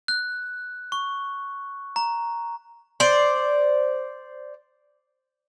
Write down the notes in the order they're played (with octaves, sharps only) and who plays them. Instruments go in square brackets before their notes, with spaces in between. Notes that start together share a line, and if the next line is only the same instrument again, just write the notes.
[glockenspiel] F#6
C#6
A#5
[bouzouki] C5 D5